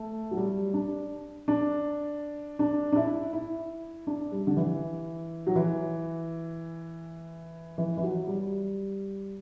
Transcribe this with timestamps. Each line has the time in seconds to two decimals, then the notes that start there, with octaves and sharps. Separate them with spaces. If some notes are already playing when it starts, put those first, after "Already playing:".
Already playing: A3
0.31 F#3
0.37 G3
0.74 D4
1.48 D4
2.59 D4
2.92 D4
2.96 E4
3.33 E4
4.07 D4
4.32 G3
4.47 D3
4.57 E3
5.47 F#3
5.56 E3
7.78 E3
7.97 E3
8.03 F#3
8.27 G3